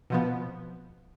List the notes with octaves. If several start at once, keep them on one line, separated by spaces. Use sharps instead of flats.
B2 F3 B3